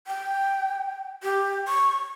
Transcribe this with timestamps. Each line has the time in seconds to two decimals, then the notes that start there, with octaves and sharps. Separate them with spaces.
0.07 G5
1.23 G4
1.68 C#6